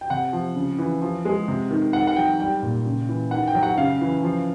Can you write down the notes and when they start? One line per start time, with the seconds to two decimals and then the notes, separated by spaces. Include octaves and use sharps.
0.01 G5
0.10 C3 F#5
0.33 F3
0.56 C#3
0.79 E3
1.02 F3
1.25 G#3
1.48 C3
1.71 D#3
1.93 D#3 F#5
2.07 F#5
2.16 F#3 G5
2.39 G3 G5
2.62 A#2
2.86 C#3
3.09 E3
3.31 D#3 F#5
3.48 G5
3.55 F#3
3.63 F#5
3.78 C#3 F5
4.01 E3
4.23 F3